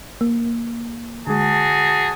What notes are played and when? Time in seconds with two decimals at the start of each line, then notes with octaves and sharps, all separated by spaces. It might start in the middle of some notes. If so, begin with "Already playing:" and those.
0.21 A#3
1.27 D3 G#3 F#4 G#4 A5